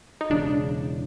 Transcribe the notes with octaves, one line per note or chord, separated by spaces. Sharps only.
D#4
E1 E2 C#3 D4